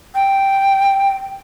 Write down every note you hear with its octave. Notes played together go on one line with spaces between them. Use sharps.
G5